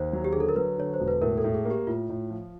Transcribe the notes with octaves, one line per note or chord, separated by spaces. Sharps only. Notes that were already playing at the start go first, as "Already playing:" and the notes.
Already playing: D#2 C5
F#3
G4
D3 G#4
A4
A#4
F#3 B4
D3 C#5
C5
E1
B4
A2 A#4
A4
A2
G#4
A#3
G4
A2 F4
A2
F3